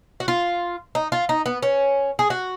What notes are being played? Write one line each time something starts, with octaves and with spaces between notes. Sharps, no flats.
F#4
F4
D#4
F4
D#4
B3
C#4
G#4
F#4